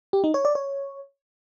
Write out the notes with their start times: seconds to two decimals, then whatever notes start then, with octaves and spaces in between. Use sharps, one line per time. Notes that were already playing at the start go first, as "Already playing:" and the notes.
0.13 G4
0.24 D#4
0.34 C#5
0.45 D5
0.55 C#5